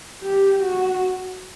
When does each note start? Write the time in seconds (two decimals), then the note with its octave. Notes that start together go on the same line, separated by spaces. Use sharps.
0.23 G4
0.63 F#4